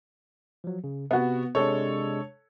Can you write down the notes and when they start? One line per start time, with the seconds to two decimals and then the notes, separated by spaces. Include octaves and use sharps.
0.64 F3 F#3
0.84 C#3
1.11 C3 B3 F#4
1.55 C3 G#3 D4 A4 C#5